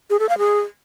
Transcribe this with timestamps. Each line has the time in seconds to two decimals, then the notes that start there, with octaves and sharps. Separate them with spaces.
0.10 G#4
0.20 A4
0.29 F5
0.38 G#4